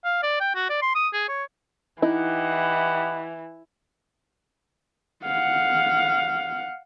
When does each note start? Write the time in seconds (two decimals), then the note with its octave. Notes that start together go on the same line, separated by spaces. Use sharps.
0.05 F5
0.23 D5
0.41 G5
0.55 F#4
0.70 D5
0.82 C6
0.95 D#6
1.13 G#4
1.29 C#5
2.02 E3 D#4 E4 G4 D#5 F#5
5.25 F5 F#5